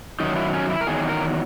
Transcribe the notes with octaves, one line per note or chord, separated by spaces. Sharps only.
F#2 D#3 F#3 D#4
E4
C#4
E4
A#4
E2 D#3 F#3 G#4
A#4